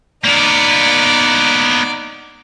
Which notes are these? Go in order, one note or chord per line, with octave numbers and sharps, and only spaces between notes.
A#3 B3 D#4 D5